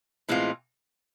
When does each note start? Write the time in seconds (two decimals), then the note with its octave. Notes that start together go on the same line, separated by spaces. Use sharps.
0.28 A2 E3 G#3 C4 F4